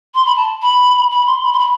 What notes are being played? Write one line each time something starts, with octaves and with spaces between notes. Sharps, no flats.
C6
B5
A5
B5
B5
C6
B5
C6
B5